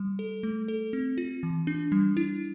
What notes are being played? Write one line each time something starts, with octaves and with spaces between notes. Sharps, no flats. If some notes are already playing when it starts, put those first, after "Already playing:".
Already playing: G3
A4
A3
A4
C4
F4
E3
D4
G3
E4